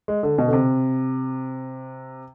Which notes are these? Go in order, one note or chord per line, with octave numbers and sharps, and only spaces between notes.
G#3
D3
B2
D3
C3